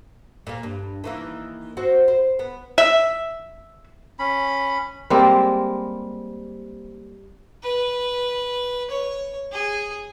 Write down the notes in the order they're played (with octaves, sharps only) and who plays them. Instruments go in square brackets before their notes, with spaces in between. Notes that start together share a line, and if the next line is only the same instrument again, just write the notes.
[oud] A#2 A#3
G2
D#3 E3 A#3
C4 F#4 C5
C5
B3
[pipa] E5
[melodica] C#4 B5
[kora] G3 G#3 A#3 C4
[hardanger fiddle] B4
C#5
G#4